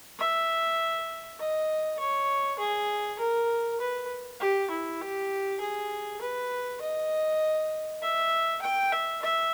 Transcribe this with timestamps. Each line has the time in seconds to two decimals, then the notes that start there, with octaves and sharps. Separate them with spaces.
0.19 E5
1.39 D#5
2.00 C#5
2.59 G#4
3.19 A#4
3.80 B4
4.40 G4
4.71 E4
5.01 G4
5.61 G#4
6.21 B4
6.81 D#5
8.02 E5
8.62 G5
8.92 E5
9.22 E5